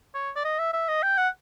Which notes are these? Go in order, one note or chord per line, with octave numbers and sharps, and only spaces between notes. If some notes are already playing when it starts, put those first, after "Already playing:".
C#5
D5
D#5
E5
E5
D#5
G5
F#5